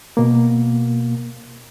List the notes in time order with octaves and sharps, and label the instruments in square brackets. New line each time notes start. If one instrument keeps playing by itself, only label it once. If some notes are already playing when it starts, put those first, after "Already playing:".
[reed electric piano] B2 A#3